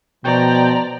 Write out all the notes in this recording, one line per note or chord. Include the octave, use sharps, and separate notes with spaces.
B2 F3 D5 G5 A#5